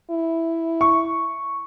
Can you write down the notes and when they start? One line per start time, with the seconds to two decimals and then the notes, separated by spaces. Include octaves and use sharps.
0.10 E4
0.81 C#6